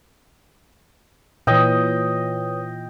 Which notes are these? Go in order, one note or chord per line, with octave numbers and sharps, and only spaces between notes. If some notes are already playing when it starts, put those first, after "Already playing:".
A#2 E3 B4 C#5 D#5 G5 D#6